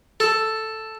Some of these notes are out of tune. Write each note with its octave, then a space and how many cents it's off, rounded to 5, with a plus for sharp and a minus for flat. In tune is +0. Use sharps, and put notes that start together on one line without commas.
A4 +0